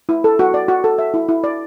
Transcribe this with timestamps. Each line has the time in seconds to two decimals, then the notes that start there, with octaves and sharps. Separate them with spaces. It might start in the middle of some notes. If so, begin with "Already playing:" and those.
0.09 E4
0.24 A4
0.39 F#4
0.54 D5
0.68 F#4
0.84 A4
0.99 E5
1.14 E4
1.29 E4
1.44 D5